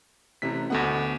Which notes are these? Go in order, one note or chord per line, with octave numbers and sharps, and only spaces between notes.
A1 C3 B6
D2 B2 A3 F#5